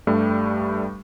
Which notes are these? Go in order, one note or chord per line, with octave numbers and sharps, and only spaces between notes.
G2 G3 A3